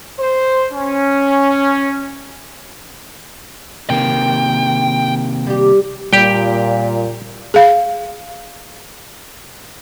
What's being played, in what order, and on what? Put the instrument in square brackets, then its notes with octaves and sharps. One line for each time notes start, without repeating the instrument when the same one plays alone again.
[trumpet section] C5
C#4
[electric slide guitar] C3 D#3 A#3 [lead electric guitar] G5
[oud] G3 G4
[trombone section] A#2 [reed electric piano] G3 D5 [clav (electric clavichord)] G4 G5
[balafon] G#4 F5